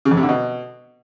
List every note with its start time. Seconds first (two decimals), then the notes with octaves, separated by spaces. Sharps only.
0.05 C#3
0.11 F2
0.17 C3
0.23 D3
0.29 B2